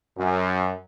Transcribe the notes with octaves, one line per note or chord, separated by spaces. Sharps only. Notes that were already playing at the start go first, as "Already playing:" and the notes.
F#2